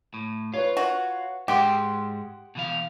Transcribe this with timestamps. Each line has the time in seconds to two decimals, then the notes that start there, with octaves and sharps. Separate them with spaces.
0.14 A2
0.54 F4 B4 C#5
0.77 F#4
1.48 G#2 G#3 G4 F#5 C6 D7
2.55 B2 E3 F5